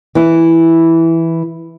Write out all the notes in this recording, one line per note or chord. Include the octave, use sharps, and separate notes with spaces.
E3 E4